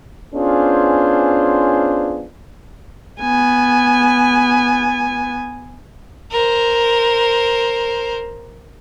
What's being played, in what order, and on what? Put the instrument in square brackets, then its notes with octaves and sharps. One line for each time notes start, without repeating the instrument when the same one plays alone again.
[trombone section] B3 C#4 D4 F4 G#4 C5
[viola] B3 G#5
[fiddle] A#4 C5